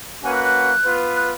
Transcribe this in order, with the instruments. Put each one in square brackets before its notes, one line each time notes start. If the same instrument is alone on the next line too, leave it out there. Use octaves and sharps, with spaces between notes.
[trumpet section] A#3 C#4 F#4 B4 F#5 [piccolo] G#5
[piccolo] F#6
F#6
[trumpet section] B3 F4 B4
[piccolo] F#6